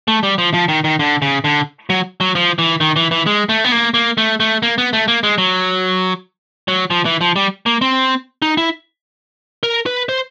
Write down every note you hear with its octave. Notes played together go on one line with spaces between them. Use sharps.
A3
G3
F3
F3
D#3
D#3
D3
C#3
D3
F#3
F#3
F3
E3
D#3
E3
E3
G#3
A3
B3
A#3
A#3
A3
A3
A#3
B3
A3
A#3
G#3
F#3
F#3
F3
E3
F3
G3
A#3
C4
D#4
E4
A#4
B4
C5